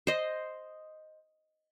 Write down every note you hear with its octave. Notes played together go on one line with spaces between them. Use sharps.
C5 D#5